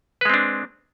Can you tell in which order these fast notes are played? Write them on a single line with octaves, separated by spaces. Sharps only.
B4 G#3 C4 D4